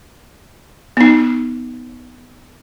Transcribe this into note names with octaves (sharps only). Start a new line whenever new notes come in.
B3 D#4